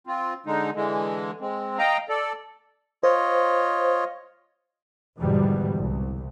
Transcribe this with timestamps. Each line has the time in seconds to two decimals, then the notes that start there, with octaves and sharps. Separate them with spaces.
0.07 C4 F4
0.46 D3 G#3 D#4
0.75 D3 E3 G#3
1.41 G#3 C4
1.78 D#5 F5 G5 A#5
2.09 A4 D5
3.03 F4 C5 C#5 D#5
5.19 G#1 E2 G#2 B2 D3 G3
5.77 C2